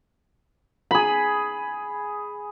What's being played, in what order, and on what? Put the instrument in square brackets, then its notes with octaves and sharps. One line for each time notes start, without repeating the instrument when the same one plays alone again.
[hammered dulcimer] G#4 B5